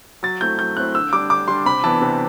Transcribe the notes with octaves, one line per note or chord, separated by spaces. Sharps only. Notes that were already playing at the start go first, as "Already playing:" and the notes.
F#3 A6
A3 C4 E4 G6
F#3 G6
A3 C4 E4 F#6
D3 E6
G3 D4 D6
D3 D6
G3 D4 C6
C3 B5
E3 B3 D4 A5
C3